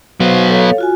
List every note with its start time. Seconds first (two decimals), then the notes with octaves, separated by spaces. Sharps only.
0.20 F#3 B3 C5 F5
0.49 A4 C#5 F5
0.78 F4 F#4 G#5